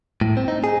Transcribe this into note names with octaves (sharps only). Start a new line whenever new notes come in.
A2
C4
D#4
G#4